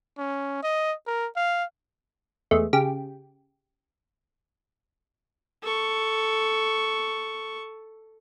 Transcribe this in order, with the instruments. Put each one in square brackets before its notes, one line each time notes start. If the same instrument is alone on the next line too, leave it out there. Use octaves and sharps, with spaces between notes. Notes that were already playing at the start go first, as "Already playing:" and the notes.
[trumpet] C#4
D#5
A#4
F5
[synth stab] E2 G#3 A3
C#3 G4
[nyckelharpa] A4 C#6